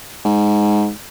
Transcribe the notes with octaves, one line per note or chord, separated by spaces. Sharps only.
G#2